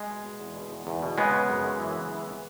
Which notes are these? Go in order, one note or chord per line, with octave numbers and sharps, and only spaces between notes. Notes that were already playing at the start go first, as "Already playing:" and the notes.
Already playing: G#3
B2
B2
E2
B2
E2
E2
B2
C#3 G#3 B3
C#3
F#2
F#2
E3
C#3
E3
E3